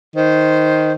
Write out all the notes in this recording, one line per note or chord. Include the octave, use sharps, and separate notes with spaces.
D#3 C5